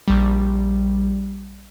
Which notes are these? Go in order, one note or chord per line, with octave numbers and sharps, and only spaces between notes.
A#1 G3